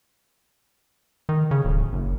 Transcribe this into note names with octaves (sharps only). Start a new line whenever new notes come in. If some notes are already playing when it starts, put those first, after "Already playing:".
D#3
C#3
D1
F#1